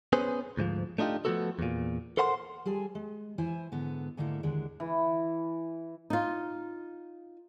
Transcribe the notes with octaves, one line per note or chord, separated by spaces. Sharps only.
B3 C#4 G#4 B4 C5
D2 G#2 E3 F3
A3 D4 D#4 F4 G4
F3 F#3 A3 B3 F#4 A4
E2 A#2
A4 A#4 C5 F#5 A5 C6
G3 G#4 A4 G#5
G#3
E3 E4 C5 G#5
G#2 D3 B3
G#2 D3 A3 A#3 E4
D#2 D3 G#3 D4
E3
D#4 F4